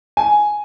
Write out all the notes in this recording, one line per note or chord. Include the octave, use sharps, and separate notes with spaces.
G#5